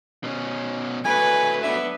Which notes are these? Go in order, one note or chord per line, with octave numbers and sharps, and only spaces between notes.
B2 C#4
F#3 A3 B4 G#5
B3 D4 E5